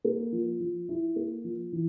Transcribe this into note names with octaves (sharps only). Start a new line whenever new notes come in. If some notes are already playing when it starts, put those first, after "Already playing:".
A#3
F3
F3
E4
A#3
F3
E3